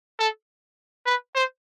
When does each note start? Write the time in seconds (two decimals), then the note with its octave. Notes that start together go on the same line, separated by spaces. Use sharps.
0.19 A4
1.06 B4
1.35 C5